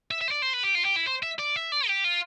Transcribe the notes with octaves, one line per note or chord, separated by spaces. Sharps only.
E5
E5
C5
D5
C5
B4
G4
F4
G4
E4
C5
E5
D5
E5
D5
G4
F4